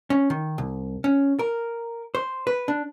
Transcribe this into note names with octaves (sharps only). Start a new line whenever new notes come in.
C#4
D#3
C2
C#4
A#4
C5
B4
D4